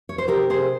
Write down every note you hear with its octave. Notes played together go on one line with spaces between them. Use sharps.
C#5
C5
C3 G4 A#4
C3 G#4 C5